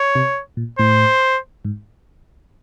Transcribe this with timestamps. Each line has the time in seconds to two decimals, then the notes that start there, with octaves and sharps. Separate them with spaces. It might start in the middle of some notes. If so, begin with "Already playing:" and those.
Already playing: C#5
0.15 C3
0.57 A#2
0.79 A2 C5
1.65 G#2